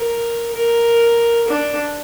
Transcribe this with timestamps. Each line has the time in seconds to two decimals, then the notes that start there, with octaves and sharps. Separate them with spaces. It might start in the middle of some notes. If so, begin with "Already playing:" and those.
Already playing: A#4
0.55 A#4
1.48 D4